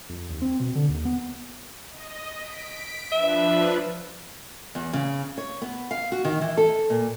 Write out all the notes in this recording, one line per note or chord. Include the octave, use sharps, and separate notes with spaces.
F2
D#2
C4
B2
D3
D#2
B3
D#5
B6 D7
F3 D4 B4 E5
E2
C#3
C#5
B3
F5
F#4
D#3
E3
A4
A#2